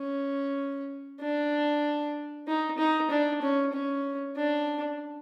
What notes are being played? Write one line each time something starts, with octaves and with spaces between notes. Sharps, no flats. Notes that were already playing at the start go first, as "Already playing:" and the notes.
Already playing: C#4
D4
D#4
D#4
D4
C#4
C#4
D4